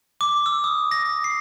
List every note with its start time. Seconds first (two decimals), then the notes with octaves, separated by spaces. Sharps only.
0.21 D6
0.46 E6
0.64 D#6
0.91 A#6
1.24 C7